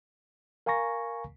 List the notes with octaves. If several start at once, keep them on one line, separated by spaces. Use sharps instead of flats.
A#4 F5 G#5 A#5 C#6 A#6